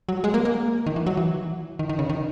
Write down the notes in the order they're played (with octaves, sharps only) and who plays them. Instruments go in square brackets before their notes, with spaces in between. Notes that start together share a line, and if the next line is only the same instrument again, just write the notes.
[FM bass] F#3
G#3
A#3
A#3
D#3
E3
F#3
E3
D#3
D#3
C#3
D#3